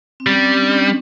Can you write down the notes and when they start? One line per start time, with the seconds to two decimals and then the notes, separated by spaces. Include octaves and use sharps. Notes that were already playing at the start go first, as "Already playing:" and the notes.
0.20 C4
0.27 G3 C#4
0.38 C4
0.50 C#4
0.60 D4
0.72 C#4